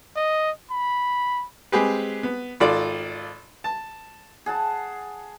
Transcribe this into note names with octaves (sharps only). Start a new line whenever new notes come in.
D#5
B5
G#3 C4 G4 G#4 B4
B3
G#1 F4 A4 D5
A5
G#4 F#5 A5